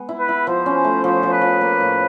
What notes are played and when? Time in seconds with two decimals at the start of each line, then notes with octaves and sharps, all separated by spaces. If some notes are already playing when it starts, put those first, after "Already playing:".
Already playing: G#3 B3
0.09 E4
0.19 B4
0.29 E4
0.47 F3 C5
0.66 C#4
0.84 A3
1.04 F3 C5
1.23 F3
1.32 B4
1.41 F3
1.61 A#3
1.81 A2